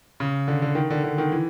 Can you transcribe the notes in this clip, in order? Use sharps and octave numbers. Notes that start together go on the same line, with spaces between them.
C#3
D3
D3
D#3
D3
D3
D#3
E3